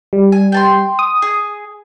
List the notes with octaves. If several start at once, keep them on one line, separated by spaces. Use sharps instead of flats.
G3
G#5
G5 A5 C6
D#6
G#4